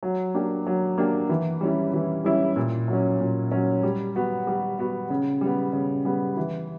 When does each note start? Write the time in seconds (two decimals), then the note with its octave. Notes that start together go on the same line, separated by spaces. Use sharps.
0.03 F#3
0.34 A#3 D4 G4
0.67 F#3
0.98 A#3 D4 G4
1.29 E3
1.61 G3 C#4 E4
1.93 E3
2.25 G3 C#4 E4
2.56 A#2
2.88 F#3 C#4
3.20 A#2
3.51 F#3 C#4
3.83 G3
4.16 B3 F#4
4.47 G3
4.79 B3 F#4
5.10 C#3
5.41 G3 B3
5.73 C#3
6.05 G3 B3
6.37 E3